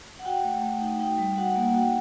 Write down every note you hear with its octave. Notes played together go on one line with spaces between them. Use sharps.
F#5
F#4 G5
A3
A3
D#4
D#4 G5
G3
F#4 F#5
A#3
F#5
F#4 G5